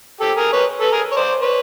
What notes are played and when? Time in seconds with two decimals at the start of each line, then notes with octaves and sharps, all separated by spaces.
0.20 G4 A4
0.37 G#4 A#4
0.52 B4 C#5
0.81 A4 B4
0.92 G#4 A#4
1.12 C#5
1.16 C5 D5
1.40 B4 C#5